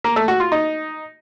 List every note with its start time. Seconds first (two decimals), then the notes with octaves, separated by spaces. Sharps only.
0.04 A#3
0.16 A3
0.28 F#4
0.40 F4
0.52 D#4